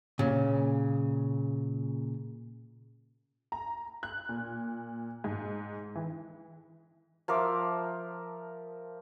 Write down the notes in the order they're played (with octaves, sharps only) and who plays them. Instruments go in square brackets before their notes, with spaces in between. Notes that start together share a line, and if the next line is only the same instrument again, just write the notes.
[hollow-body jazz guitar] A#2 C#3
[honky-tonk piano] A#5
F#6
A#2
G#2
E3
[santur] F3 A#4 E5 D6